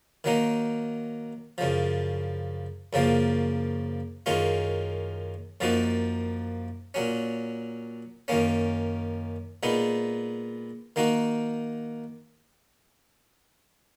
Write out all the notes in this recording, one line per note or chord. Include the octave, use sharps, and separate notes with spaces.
D#3 F#3 A#3 D#4
F#2 C#3 F3
F#2 C#3 F3 A#3
F#2 D#3 G#3 C#4 F4
F#2 F3 A#3 D#4 F#4
A#2 F#3 C#4
F#2 D#3 A#3 C#4
A#2 G#3 B3 D#4
D#3 A#3 D#4 F#4